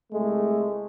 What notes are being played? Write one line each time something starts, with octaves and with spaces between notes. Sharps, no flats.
C2 G#3 A3